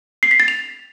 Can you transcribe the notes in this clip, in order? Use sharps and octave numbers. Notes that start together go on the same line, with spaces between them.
C7
B6
A6
F7